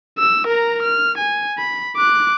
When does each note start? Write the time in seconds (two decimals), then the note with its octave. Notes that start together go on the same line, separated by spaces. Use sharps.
0.18 E6
0.47 A#4 A#5
0.82 F6
1.18 G#5
1.58 B5
1.96 D6 F#6